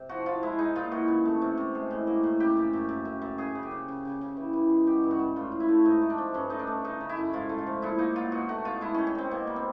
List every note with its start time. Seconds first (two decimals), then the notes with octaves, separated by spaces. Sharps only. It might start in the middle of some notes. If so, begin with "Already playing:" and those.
Already playing: C3
0.09 F3 F#4
0.26 F3 F4
0.43 G#3 E4
0.59 G#3 D#4
0.76 A#2 F4
0.91 E3 F#4
1.08 C#3
1.25 A3
1.42 C3
1.57 C3
1.75 G#3
1.91 A2
2.07 A#3
2.23 A2
2.40 C#3 G4
2.57 F#2
2.73 F#2
2.89 F#2
3.05 F#2
3.22 F#2
3.38 C#3 G#4
3.55 C#3
3.63 G4
3.71 C#3
3.88 C#3
4.05 C#3
4.21 C#3
4.37 E3
4.53 E3
4.70 G#3
4.86 F#3 G4
5.04 G2
5.11 F#4
5.19 G2
5.36 A2 F4
5.52 A2
5.60 E4
5.68 A3
5.85 G#2 D#4
6.02 A3
6.10 D4
6.18 F3
6.34 G2 C#4
6.50 A3 D#4
6.59 D4
6.67 A3
6.84 C#3 D#4
7.00 C#3
7.09 E4
7.17 F#2
7.33 G#2 F4
7.49 A3
7.58 F4
7.67 F3
7.82 A#2 E4
7.99 A#3 D#4
8.16 F#3 F4
8.32 B2 F#4
8.49 A3 F#4
8.65 B2 F4
8.81 G#3 E4
8.94 D#3 C#4
9.07 C#4
9.15 D#3 C4
9.31 B2 A#3
9.47 G3
9.56 C4